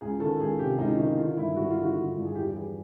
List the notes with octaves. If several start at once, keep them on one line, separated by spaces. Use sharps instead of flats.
C#2 G#4
D#3 A4
C#2 G#4
C3 G4
C#2 D#4
D#3 D#4
D3 F4
G2 E4
G2 F#4
F4
D3
F#4
D3
G2
G#4
E2 G4
E3 G#4